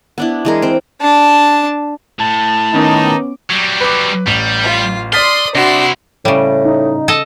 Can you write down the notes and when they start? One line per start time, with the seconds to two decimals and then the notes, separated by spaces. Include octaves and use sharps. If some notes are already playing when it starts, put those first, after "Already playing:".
0.18 B3 D4 E4
0.45 E3 G#3 A#4
0.62 C4 G5
1.01 D4 A5
2.19 A2 A5
2.74 D#3 B3 C#4 D#4 D6
3.50 F#3 G3
3.81 B4 D6
4.27 A1 G3
4.63 F4
5.13 D5 C6 D#6 F6 A6 B6
5.55 C3 D4 E4 F#4 C6
6.25 A2 C#3 G3
6.65 D#4
7.08 A4 D#5 A5